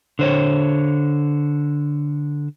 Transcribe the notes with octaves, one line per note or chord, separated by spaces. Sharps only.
D3 C5 C#5